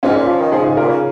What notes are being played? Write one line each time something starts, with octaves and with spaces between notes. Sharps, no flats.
G#2 C#4 F4
A#2
F3
D#3
F3 D#4 G#4
G#2
A#2 F4 A#4
C#3